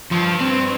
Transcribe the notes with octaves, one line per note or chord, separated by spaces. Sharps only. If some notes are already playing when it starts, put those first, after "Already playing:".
G2 F3
C4